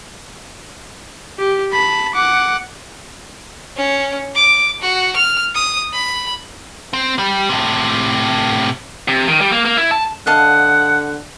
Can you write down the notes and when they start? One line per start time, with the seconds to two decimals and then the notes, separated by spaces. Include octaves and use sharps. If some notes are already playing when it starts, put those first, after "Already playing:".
1.39 G4
1.73 A5 B5
2.14 F#5 D6
3.77 C#4
4.35 D6
4.82 F#4
5.16 F6
5.55 D#6
5.93 B5
6.93 C4
7.19 G3
7.49 A2 C3
9.08 C3
9.28 D#3
9.41 G3
9.52 A#3
9.65 A#3
9.77 E4
9.91 A5
10.27 D3 D#5 F5 F#5 A5